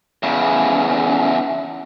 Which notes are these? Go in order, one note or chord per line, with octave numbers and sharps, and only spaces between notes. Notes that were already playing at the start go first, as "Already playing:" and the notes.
E2 C#3